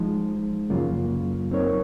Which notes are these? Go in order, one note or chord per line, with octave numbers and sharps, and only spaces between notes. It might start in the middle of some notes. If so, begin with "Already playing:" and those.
Already playing: F3 G#3 D#4
F#2 C#3 F#3 A#3 F4
F#3 C4 D#4 A#4 C#5